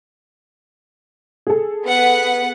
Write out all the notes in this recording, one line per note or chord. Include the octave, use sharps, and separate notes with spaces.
G#4 A4
B3 F#5